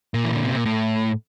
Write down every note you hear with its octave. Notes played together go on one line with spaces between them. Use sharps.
A#2
E3
D3
C3
A#2
A2